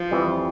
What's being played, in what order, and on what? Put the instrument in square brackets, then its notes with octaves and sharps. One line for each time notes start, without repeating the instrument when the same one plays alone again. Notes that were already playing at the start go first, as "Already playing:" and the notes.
Already playing: [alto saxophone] F3
[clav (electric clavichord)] F2 E3 G3